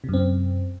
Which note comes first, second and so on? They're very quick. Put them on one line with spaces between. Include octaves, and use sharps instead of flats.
C3 F#2 C4